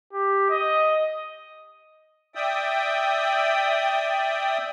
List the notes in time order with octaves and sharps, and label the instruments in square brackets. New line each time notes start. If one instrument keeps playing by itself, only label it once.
[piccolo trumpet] G4
D#5
[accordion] D5 E5 G5 D#6